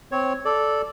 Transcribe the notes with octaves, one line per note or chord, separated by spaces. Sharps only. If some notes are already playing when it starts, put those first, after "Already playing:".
C4 C#5
A4 D5